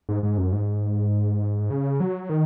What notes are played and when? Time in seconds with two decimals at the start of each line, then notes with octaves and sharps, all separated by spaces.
0.09 G#2
0.23 G#2
0.38 F#2
0.53 G#2
1.70 C#3
2.00 F#3
2.29 D#3